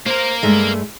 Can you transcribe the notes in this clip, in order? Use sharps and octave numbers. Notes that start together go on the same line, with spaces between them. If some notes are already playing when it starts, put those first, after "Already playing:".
A#3 A#4 C5
G2 G#3 A3